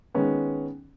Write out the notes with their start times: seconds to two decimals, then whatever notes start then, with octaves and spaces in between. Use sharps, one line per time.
0.14 D#3 G#3 B3 C#4